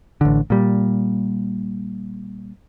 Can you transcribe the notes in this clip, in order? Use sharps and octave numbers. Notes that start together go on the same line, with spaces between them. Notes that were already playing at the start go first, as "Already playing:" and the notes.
A1 D3
A#2 G3